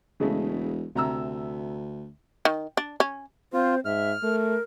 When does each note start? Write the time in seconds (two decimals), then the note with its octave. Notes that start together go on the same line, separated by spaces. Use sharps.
0.20 E1 C#3 G#3 A3
0.96 D2 C3 A#5 E6
2.45 D#3
2.77 D4
3.00 C#4
3.53 C4 F4 C5
3.85 G#2 E5 F6
4.23 A3 A#4